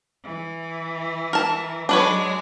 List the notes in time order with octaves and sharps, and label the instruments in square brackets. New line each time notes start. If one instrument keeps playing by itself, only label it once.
[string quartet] E3
[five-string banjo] A#4 A5
[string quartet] F#3 G#3 [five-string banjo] D4 B4 C#5